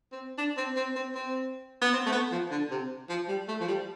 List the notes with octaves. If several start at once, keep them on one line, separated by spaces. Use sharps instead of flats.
C4
D4
C4
C4
C4
C4
B3
C4
A3
B3
F3
D3
C3
F3
G3
A3
F3
G3